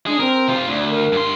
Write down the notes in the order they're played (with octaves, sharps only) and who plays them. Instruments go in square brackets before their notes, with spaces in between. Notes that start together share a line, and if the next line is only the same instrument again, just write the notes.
[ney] D4 [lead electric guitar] G#4 D#5
[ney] C4 [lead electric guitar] A#4
[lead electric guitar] C3 F4
[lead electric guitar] D2 [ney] D5
[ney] A#4
[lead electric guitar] G2 C6